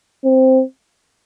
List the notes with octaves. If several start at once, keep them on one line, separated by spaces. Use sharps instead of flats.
C4